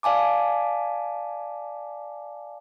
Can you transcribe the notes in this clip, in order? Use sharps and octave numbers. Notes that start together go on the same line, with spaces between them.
D5 F5 G#5 A5 D6